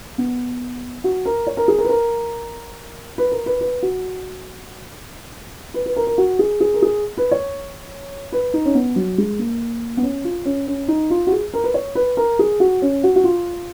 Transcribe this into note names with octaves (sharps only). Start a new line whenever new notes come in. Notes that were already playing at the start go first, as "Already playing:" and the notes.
B3
F#4
A#4
C#5
A#4
G#4
A#4
B4
A#4
B4
A#4
B4
B4
F#4
B4
B4
A#4
A#4
F#4
G#4
G#4
A#4
G#4
B4
C#5
B4
D#4
C#4
B3
F#3
G#3
A#3
B3
C#4
F4
C#4
C#4
D#4
F4
F#4
G#4
A#4
B4
C#5
B4
A#4
G#4
F#4
C#4
F#4
F#4
F4